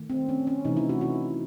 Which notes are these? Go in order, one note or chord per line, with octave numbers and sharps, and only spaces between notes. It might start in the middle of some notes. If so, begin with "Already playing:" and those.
Already playing: D#3 A3
C4
C#4
C#4
C3 E3 A3 D#4
E4
F#4
E4